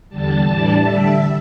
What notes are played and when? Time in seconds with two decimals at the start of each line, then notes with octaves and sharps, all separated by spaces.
0.09 E2 D3 G3 A5
0.45 A2 E3 G3 D4
0.81 D3 G3 D4 E5